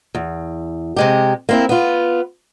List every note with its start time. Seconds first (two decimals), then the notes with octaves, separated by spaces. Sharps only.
0.15 E2
0.96 C3 G#3 G4
1.49 A#3 C4 E4
1.69 B3 F4